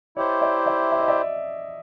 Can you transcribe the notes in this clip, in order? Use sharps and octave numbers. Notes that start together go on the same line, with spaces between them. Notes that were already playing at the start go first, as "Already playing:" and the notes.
E4 G4 C5 C#5 D#5
D5 E5
D5 E5
E5
D#5
D5 E5